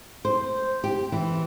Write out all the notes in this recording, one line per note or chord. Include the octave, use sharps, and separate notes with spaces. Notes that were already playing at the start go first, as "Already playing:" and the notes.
C5
G4
E3